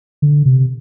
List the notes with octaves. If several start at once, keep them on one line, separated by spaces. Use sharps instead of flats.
D3
C3